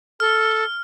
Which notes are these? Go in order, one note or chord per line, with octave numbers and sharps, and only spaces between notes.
A4 F6